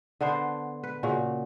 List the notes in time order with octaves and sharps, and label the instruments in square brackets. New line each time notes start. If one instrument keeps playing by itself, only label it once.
[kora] D3 B3 D4 C5
B4
A#2 C#3 F#4